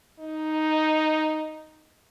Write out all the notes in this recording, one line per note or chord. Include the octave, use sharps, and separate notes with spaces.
D#4